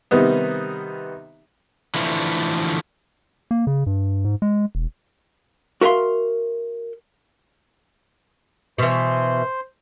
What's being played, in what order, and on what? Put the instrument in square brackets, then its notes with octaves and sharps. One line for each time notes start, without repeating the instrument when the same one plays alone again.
[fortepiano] C3 D#3 G3 B3 D#4
[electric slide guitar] D3 E3 F3 A3
[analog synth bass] A#3
C#3
G2
G#2
G#3
E1
[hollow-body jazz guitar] F#4 A#4 E5 F5 C6
[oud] B2 E3 [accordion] C5